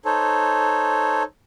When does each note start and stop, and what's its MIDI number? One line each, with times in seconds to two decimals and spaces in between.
0.05 1.23 63
0.05 1.23 69
0.05 1.23 72
0.05 1.23 73